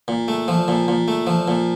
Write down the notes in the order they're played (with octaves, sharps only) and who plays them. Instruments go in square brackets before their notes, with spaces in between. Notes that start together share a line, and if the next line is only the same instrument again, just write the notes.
[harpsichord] A#2
A3
F3
A#2
A#2
A3
F3
A#2